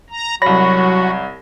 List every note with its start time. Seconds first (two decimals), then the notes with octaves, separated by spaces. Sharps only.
0.10 A#5
0.42 C2 F#3 F#4 C#5 B5 A#6